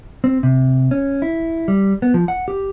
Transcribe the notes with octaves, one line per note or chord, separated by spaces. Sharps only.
C4
C3
C#4
E4
G3
B3
F3
F#5
G4